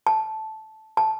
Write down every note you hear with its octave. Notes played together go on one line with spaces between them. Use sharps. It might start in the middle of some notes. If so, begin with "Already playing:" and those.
A5
A5